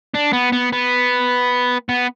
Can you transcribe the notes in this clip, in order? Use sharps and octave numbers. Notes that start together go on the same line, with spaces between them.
D4
B3
B3
B3
B3